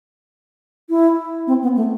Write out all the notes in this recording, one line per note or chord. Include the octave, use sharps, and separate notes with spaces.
E4
C4
B3
A3